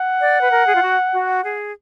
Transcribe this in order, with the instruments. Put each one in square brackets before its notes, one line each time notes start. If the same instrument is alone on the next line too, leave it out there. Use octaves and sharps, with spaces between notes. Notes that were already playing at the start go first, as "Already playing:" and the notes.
Already playing: [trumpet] F#5
[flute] D5
B4
A#4
G#4
F4
F#4
F#4
G#4